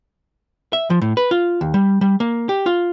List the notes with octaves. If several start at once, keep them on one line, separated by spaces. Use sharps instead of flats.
E5
F3
A2
B4
F4
D#2
G3
G3
A#3
G4
F4